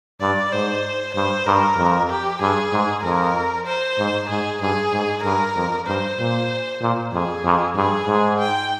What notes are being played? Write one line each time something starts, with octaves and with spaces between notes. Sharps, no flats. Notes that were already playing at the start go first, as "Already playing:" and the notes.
G2 D5
G#2 C5
G2 C5
G2 A#4
F2
G4
G2 G#4
G#2
F2 A#4
C5
G#2
G#2 G#4
G2 G#4
G#2
G2 A#4
F2
G2 C5
A#2
A#2
F2 G#4
F2
G2 G#4
G#2
G5